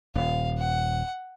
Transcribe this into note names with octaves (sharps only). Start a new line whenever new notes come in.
D#1 F5
F#5